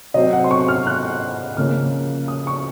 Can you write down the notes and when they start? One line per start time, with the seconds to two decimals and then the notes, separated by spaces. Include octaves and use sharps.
0.14 C3 F#3 C4 D#5
0.33 F#5
0.44 C6
0.51 C#6
0.68 F6
0.87 F#6
1.57 C#3 F3 A#3 C#4 F6
2.28 D#6
2.47 C#6